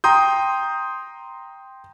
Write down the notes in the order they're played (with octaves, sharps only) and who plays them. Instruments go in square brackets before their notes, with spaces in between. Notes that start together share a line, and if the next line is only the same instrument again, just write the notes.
[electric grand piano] G5 A#5 C6 D#6 G6